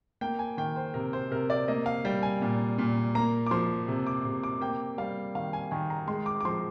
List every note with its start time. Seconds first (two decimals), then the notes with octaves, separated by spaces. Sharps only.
0.21 A#3 G5
0.39 G#5
0.57 D#3 G5
0.76 C5
0.94 C3 A#4
1.13 C5
1.31 C3 A#4
1.50 D5
1.68 A#3 D#5
1.86 F5
2.05 G3 G5
2.23 G#5
2.42 A#2
2.78 A#2
3.15 A#3 A#5
3.46 D6
3.51 F3 C6
3.88 C3
4.07 D6
4.25 C3
4.44 D6
4.61 A#3 G5
4.98 G3 F5
5.35 D#3 F5
5.53 G#5
5.71 D#3 G#5
5.90 A#5
6.07 G#3 C6
6.26 D6
6.41 D6
6.45 F3 C6